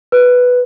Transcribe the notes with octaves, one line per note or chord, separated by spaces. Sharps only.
B4